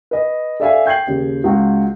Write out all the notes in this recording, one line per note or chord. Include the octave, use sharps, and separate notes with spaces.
B4 D#5
A4 D5 E5 F5 G#5
G5 G6 G#6 C7 F#7
D#2 C#3
C#2 F#4